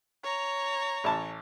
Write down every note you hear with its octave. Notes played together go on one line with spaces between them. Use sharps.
C#5 A#5
A1 A5